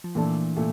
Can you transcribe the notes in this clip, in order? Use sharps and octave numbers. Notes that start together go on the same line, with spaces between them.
F3
A#2 E3 A3 D4 A4
A#2 A3